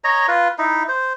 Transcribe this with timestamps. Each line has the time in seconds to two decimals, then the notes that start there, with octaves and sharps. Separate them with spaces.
0.04 C#5 D#5 A#5
0.28 F4 B4
0.58 D#4 E4
0.89 C5